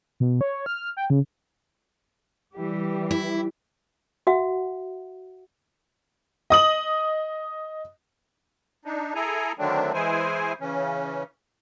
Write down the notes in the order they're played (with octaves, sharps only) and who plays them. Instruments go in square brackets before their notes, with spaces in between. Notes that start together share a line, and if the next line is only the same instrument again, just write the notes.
[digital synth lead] B2
C#5
F6
G5
C#3
[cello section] E3 G3 G4
[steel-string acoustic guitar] E4
[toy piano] F#4 E5 F#5
[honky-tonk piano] D#5 D#6 F#7
[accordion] D4 D#4
E4 G#4 A4 G#5 A#5
D3 D#3 F#3 A3 C4 D4
E3 G#3 E4 G#4 C5 G#5
C#3 E3 C#4